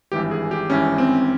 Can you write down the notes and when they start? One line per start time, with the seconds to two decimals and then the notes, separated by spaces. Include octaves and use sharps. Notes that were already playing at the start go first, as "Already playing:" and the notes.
0.12 G#1 G2 E3 G4
0.31 G#4
0.51 G4
0.70 G#1 G2 E3 C#4
0.98 C4